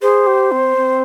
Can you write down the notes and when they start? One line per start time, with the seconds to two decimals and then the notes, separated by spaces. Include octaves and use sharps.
0.02 G#4 C5
0.27 G4
0.52 C4
0.77 C4